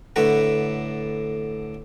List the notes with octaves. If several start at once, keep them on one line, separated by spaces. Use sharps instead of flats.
A2 D3 B4 F#5 A#5